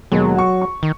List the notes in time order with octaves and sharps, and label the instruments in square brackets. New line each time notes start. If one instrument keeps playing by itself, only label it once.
[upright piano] D#2 B2 G#3 [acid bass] F#3
[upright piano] F#4 C#6
C#6
[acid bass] D#3